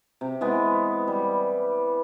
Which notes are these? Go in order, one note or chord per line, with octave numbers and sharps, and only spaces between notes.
C3
E3 G#3 B3
G3